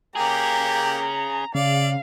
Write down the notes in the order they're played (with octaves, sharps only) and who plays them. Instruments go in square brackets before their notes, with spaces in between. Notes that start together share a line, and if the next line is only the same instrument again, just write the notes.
[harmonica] A#3 G4 [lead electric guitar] C#4 G#4 [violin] A#5
[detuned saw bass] C#3 [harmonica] D5 [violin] F5